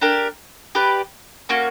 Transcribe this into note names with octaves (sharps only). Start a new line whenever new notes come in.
D4 G4 A#4
G4 B4 D5
A#3 C#4 F#4